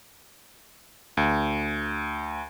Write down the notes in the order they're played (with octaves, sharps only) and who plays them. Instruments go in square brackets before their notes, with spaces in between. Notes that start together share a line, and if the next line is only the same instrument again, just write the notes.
[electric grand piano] D2